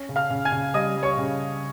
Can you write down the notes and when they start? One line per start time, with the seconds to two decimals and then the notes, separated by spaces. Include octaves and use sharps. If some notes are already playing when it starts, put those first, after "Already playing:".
Already playing: C#4
0.09 C#3
0.16 F5 F6
0.30 C#3
0.45 G#5 G#6
0.52 C#3
0.74 G3 D#5 D#6
0.96 G3
1.03 C#5 C#6
1.18 C#3